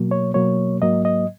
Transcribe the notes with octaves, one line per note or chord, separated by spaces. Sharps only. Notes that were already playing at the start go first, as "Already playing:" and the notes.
Already playing: B2 F#3 A#3
C#5
B2 F#3 A#3 C#5
G#2 F#3 A#3 D#5
D#5